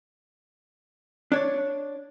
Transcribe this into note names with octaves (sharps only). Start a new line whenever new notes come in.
D4 C#5 D5